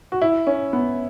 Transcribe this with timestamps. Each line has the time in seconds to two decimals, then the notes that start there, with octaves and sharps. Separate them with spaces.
0.12 F#4
0.22 E4
0.47 C#4
0.73 B3